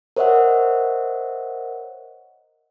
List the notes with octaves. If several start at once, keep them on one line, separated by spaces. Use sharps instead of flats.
A#4 C5 C#5 D#5 E5 F#5